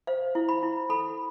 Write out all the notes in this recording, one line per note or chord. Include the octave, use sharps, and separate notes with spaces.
C5 F5
E4
B5
E4
A4 B5